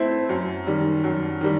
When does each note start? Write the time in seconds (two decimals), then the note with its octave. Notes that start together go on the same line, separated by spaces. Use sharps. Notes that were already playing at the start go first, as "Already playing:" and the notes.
Already playing: A3 C4 E4
0.29 F#2
0.67 D#3 G3
1.04 F#2
1.41 D#3 G3